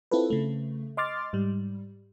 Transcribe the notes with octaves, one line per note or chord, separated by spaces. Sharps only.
C4 E4 F4 A4 B4
C#3 A3
D#5 C6 D6 F6 A6
G#2 G3